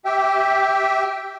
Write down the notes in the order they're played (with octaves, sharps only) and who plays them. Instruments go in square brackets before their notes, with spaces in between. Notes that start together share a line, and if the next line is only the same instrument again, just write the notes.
[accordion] G4 E5 G5